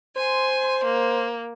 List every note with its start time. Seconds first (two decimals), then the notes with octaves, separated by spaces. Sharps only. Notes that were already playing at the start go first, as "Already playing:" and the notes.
0.16 C5 G#5 C6
0.84 A#3